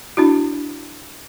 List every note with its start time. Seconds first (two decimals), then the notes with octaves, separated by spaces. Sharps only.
0.17 D4 E4 F#4